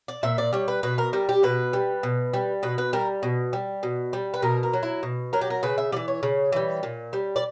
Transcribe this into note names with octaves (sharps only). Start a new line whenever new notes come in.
D5
A#2 E5
D5
G3 C#5
B4
B2 B4
A#4
G3 A#4
G4
B2 B4
G3
B2
G3
B2 B4
B4
G3 A#4
B2
G3
B2
G3
B4
B2 A#4
A#4
F#3
E4
B2
F#3 A#4
G4
A#4
C#3 B4
E5
E3 G3 D5
C#5
C#3
E3 G3
A#2
G3
D5